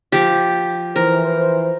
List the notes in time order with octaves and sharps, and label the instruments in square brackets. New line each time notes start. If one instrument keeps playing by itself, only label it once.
[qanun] F3 G4
[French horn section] E3 C5 [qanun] A#4